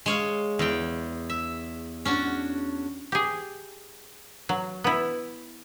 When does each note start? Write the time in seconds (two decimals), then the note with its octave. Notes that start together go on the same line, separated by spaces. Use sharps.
0.06 G#3 C#5 F5
0.59 E2 G5
1.30 E5
2.05 C#4 D4 F#4
3.12 G4 G#4
4.49 F#3
4.84 B3 E4